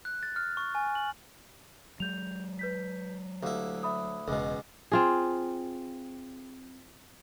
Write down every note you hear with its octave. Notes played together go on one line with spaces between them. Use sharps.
F#6
A6
F6
C#6
G#5
F#7
F#3 G#3 G6 F7
B4 G6 B6
D2 E4 G4 F5
E5 B5 D#6
E1 C#2 B2
C4 F4 G#4